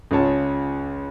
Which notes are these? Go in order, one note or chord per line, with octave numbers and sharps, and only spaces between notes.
C#2 C#3 F4 C#5 A5